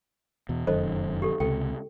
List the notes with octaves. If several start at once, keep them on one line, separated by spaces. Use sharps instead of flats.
E2 B2
F1 F#2 D#3 A4 C5 D#5
G4 A4
C#2 C3 A4 G5